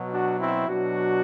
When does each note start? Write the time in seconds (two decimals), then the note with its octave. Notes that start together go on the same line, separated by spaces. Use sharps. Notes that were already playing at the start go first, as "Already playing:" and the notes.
Already playing: B2 F#3
0.12 D4 F#4
0.40 C4 E4
0.68 B2 F#3 D4 F#4